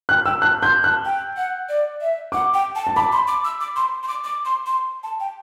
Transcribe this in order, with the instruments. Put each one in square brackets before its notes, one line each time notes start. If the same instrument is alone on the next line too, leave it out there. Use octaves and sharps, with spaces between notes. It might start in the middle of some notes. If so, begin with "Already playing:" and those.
[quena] G5 [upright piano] F#6
[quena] G5 [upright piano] E6
[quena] A5 [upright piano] F#6
[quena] C6 [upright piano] G6
[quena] A5 [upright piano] F#6
[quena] G5
F#5
D5
E5
[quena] F#5 [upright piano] D6
[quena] G5
A5
[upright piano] A5
[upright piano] B5 [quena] D6
[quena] C6
D6
E6
D6
C6
C6
D6
D6
C6
C6
A5
G5